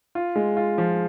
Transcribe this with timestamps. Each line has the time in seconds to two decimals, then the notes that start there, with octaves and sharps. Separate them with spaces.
0.15 F4
0.36 G#3
0.57 F4
0.78 F3